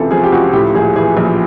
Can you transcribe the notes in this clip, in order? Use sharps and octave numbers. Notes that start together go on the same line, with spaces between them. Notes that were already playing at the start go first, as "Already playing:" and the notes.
Already playing: C#2 C3 E3 A4
F3 G#4
G4
C#2 F#4
A2 G4
A#1 G#4
E3 G#4
A#1